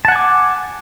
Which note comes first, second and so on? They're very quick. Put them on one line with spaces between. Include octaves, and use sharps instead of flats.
A5 F#5 G#5 D6